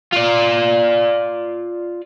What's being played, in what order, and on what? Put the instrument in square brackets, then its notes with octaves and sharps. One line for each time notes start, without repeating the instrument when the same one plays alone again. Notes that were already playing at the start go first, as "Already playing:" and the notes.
[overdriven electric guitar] F4 D5